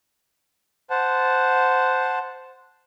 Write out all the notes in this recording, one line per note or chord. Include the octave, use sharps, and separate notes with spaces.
C5 F#5 A5